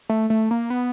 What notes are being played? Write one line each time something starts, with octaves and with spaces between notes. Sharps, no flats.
A3
A3
A#3
B3